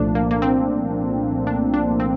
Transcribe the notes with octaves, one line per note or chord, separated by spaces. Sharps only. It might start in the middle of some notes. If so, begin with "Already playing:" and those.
Already playing: C2 A#2 F3 A3 D4
A#3
A#3
C4
D4
D4
C4